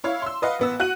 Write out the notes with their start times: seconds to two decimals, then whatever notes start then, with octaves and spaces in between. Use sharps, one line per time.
0.04 E4 C#5 F5
0.22 C6 E6
0.42 B4 D#5 F5 F#5
0.59 A1 B3 E6
0.80 F#4 F#6 D#7 F#7